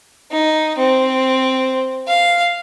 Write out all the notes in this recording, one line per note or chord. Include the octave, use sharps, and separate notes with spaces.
D#4
C4
F5